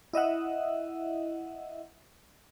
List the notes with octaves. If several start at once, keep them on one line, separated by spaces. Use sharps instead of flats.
E4 D#5 E5 F#5